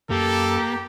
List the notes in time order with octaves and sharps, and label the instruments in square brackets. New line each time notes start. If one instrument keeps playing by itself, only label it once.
[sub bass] F#2 [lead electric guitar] A#3 [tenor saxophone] G4 [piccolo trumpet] A4